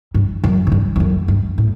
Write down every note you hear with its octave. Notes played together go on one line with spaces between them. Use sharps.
G2
F#2
A2
G2
E2
F#2
G2
A2